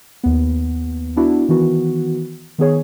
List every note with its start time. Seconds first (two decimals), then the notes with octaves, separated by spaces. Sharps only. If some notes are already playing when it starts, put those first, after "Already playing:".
0.24 D#2 B3
1.16 B3 D4 E4 F#4
1.48 D#3 E3 B3 F#4
2.59 D#3 B3 G#4 C#5